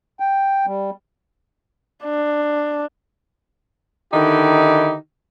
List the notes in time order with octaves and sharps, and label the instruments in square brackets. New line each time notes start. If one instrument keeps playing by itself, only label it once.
[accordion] G5
G3
[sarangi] D4
[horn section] D3 D#3 D#4 E4 G4